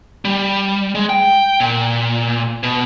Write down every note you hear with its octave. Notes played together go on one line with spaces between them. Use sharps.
G3
G#3
G5
A#2
B2